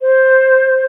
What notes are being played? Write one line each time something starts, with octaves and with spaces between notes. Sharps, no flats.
C5